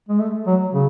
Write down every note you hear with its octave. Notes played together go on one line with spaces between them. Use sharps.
G#3
A3
F#3
C#3